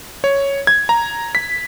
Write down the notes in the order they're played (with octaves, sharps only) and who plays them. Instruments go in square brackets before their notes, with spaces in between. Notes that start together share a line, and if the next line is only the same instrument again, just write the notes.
[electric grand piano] C#5
G#6
A#5
B6